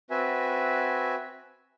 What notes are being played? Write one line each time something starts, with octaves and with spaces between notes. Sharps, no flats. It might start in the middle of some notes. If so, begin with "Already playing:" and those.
C4 F#4 B4 E5 G#5